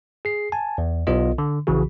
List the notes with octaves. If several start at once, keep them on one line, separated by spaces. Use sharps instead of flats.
G#4 C7
G#5 A5
E2
B1 B3 F4 D#5
D3
A#1 C#3 E3 F#4 G#4